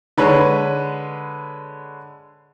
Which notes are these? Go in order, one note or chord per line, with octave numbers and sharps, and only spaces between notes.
D3 G#3 B4 C#5